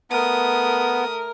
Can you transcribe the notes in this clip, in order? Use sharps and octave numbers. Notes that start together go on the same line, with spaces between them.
A3 B3 A#4 D#6